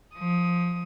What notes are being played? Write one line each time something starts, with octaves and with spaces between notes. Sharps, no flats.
F3 D#6